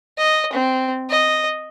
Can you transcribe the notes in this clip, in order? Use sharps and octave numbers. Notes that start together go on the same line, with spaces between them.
D#5
C4
D#5